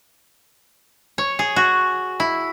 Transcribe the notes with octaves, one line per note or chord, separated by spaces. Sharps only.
C#5
G#4
F#4
E4